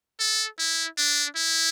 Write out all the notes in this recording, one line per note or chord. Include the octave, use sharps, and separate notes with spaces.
A4
E4
D4
E4